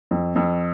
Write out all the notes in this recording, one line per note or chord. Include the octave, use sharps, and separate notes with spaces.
F2
F2